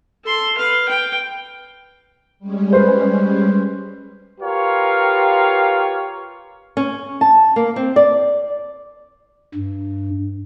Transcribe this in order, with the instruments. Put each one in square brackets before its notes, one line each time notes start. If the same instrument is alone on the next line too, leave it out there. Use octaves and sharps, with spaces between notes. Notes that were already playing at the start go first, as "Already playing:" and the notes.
[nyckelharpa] A4 C6
B4 F5
G5
[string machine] G3 G#3 C#4
[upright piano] B4 C5
[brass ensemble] F4 G4 A#4 B4 C#5 F5
[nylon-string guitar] C#4
A5
A#3
C4
D5
[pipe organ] G2